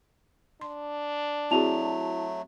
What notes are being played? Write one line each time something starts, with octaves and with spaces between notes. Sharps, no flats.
D4 C6
F#3 A3 C4 E4 F#4 G#4 A5 F7